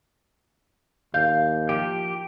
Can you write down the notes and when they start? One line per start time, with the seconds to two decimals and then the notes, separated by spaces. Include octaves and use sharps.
1.14 D#2 F5 G6
1.69 F3 G4